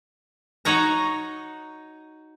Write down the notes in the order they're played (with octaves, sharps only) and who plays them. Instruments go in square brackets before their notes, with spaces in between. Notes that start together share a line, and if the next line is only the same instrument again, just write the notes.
[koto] D#4 F#4 C#5 A#5